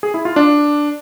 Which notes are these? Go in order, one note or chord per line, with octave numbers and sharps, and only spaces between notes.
G#4
E4
F4
D4